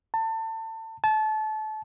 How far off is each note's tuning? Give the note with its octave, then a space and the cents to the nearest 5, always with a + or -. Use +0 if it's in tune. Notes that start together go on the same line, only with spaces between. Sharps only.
A5 +30
A5 -25